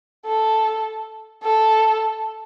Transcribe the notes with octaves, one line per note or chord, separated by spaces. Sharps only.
A4
A4